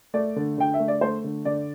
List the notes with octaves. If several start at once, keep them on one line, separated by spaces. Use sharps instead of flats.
A3 D5
D3
D3 G5
E5
A3
D5
A3 C5
D3
D3 D5